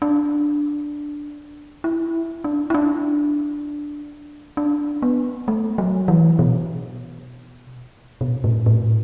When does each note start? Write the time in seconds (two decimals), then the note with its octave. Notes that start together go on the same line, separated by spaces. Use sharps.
0.02 D4
1.84 E4
2.44 D4
2.70 E4
2.74 D4
4.57 D4
5.02 B3
5.48 A3
5.78 F#3
6.08 E3
6.39 B2
8.21 B2
8.44 A2
8.66 A2